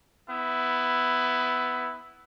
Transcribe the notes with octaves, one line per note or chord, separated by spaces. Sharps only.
B3 E4